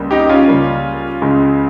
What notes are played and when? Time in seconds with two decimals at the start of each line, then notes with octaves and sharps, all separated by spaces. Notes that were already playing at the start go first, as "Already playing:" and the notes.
Already playing: C#2 C#3 G3 A#3
0.11 D#4 G4
0.29 C#4 F4
0.48 C#2 C#3 G3 A#3
1.22 C#2 C#3 G#3